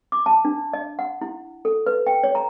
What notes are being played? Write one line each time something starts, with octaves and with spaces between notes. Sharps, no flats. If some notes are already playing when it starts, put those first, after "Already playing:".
D6
A5
D4
D#5
F#5
E4
A4
B4
G5
C#5
A#5